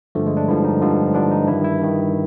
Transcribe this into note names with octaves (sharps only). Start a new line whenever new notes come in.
G2 D3 F3 A3
G#3
D4
G2 D3 F3 E4
D#4
G2 D3 F3
G2 D3 F3 D4
D#4
G2 D#3 E4
E4
G2 D#3